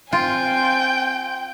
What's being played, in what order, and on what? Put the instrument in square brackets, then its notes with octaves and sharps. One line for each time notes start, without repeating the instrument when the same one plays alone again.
[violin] C4 G#5 [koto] F4 [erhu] G5